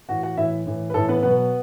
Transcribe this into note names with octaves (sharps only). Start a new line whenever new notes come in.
A2 E3 F#4 F#5
F#4 F#5
A2 E3 E4 E5
A2 E3
B4
A2 E3 A4
B3 B4
B2 F#3 B3 B4